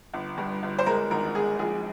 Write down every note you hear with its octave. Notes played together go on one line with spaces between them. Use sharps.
G1
G2
G1
C5
G#3 A#4
G#1 A#4
G#3 G#4
A#1 G#4